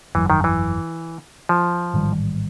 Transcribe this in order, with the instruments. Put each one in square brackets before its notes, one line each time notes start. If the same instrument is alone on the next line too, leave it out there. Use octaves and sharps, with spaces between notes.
[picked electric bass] G1 F2 C#3 F#3 [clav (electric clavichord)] E3
[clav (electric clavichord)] D#3
E3
F3
[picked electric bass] A1 G#2 D#3 G3